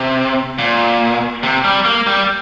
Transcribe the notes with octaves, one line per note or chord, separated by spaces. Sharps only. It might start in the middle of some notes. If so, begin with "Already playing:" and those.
Already playing: C3
A#2
C3
G3
A#3
G3